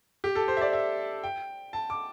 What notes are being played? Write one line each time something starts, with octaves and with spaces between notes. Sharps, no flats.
G4
A4
C5
E5
D5
E5
G5
A5
D6